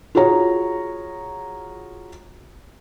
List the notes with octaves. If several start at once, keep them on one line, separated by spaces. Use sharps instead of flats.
F4 F#4 G#4 C#5 A#5